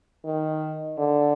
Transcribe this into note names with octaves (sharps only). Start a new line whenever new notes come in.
D#3
D3